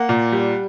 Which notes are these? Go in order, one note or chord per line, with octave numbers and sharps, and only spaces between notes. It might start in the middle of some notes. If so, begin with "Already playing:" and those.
Already playing: A#3 F#5
A#2
G3